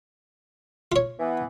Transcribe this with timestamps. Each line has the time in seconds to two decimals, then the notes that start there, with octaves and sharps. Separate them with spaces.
0.92 F4 C#5
1.18 E3 B3